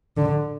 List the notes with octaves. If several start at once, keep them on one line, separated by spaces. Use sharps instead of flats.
D3